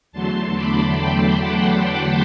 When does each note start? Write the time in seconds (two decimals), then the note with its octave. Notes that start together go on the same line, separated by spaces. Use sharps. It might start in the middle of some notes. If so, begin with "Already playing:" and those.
0.12 E2 D3 F#3 A3 A5 C6
0.55 B5 D6
0.97 G5 B5
1.40 F#5 A5
1.82 G5 B5